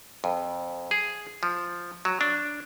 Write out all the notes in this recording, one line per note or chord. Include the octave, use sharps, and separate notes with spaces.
F2
G#4
F3
F#3
D4